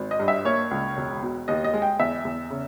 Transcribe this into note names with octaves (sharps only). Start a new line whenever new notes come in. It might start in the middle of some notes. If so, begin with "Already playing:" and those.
Already playing: G#1
D#5
G2
E5
A#3 C#5
C#2
E1
B2
D#2 D#5
D#5
G#3
G5
E2 E5
E2
C#3